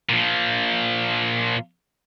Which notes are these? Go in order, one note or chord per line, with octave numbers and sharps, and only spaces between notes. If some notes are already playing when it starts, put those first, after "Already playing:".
A#2 F3